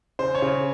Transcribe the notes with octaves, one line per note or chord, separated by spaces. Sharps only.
C#3 C5
C#5
C#3